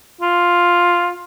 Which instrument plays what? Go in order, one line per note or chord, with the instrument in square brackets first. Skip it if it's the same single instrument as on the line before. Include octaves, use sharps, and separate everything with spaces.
[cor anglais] F4